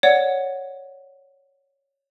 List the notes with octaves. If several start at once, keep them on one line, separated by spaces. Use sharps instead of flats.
C#5 D5 F#5